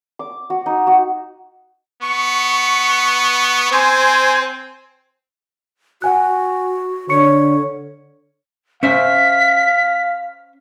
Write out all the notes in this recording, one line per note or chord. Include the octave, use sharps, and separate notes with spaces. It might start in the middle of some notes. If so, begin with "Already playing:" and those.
D6
F#4
D#4
F#4
B3 C#6
C4 C5 G#5
F#4 F#5 G#5 F#6
D3 C#5 C#6 C#7
C#4 C5 E5 F5 B6